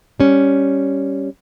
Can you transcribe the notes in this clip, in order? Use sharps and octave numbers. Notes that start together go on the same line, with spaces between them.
G3 C#4